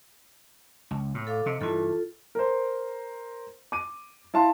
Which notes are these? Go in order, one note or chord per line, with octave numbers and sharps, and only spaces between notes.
C#2
A2
A4 F5 D6
C3 D#5
G2 E3 F4 A4
A#4 C5
D6 D#7
E4 F5 A5 C6